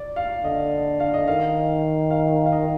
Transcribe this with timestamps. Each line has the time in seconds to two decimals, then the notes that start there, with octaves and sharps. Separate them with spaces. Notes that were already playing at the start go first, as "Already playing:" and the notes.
Already playing: D5
0.16 F5
0.44 D3 D#5
1.00 F5
1.14 D#5
1.27 D#3 F5
2.11 F5
2.46 F5
2.52 D#5